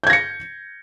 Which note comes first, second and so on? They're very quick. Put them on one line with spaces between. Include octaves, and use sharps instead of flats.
G6 G#6 A#6 C#7